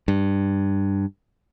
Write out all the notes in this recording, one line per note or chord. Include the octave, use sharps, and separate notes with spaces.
G2